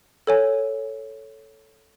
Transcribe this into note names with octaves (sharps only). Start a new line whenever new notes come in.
A4 C#5 G#5